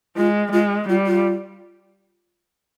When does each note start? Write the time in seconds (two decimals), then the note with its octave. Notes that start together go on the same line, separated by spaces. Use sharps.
0.17 G#3 F4
0.52 G#3 F4
0.89 G3 F4
1.06 F4